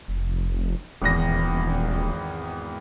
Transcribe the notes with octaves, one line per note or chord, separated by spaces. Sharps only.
F1
D#1 G#1 E2 A#6